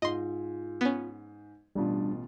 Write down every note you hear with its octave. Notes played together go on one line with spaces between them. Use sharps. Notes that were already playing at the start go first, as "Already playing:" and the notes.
G#2 F4 D#5 C6
B3 C#4
A1 B2 G3 D4 F4